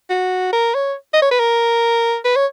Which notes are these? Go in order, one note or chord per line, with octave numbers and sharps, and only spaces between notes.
F#4
A#4
C#5
D#5
C#5
B4
A#4
B4
C#5